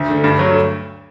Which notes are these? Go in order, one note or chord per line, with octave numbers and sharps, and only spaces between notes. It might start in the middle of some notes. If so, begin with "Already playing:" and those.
Already playing: D2
D3 A3
G2
F#3 A3